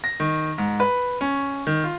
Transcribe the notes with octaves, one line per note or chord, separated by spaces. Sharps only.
A#6
D#3
G#2
B4
C#4
D#3
F4